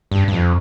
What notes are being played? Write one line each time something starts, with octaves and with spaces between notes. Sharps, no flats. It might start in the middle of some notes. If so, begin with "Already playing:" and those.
G2
G2
F2